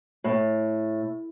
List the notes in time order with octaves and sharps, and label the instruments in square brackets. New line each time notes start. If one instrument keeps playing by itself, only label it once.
[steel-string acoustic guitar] A2